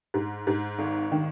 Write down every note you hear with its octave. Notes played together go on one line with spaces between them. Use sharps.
G#2
G#2
G#1
D#3